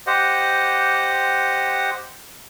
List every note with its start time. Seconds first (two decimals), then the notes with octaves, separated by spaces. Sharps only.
0.07 G4 C5 D#5 F#5